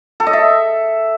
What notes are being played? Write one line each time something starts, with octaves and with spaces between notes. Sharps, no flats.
A4
D#5
E5